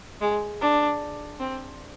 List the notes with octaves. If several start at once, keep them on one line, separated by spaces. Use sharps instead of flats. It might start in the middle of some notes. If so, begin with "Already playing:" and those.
G#3
D4
C4